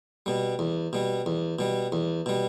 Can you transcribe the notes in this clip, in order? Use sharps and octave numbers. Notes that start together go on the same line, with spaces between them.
B2 G3
E2
B2 G3
E2
B2 G3
E2
B2 G3